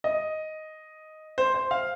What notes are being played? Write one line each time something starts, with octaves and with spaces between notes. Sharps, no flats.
D#5
C5
C5
F5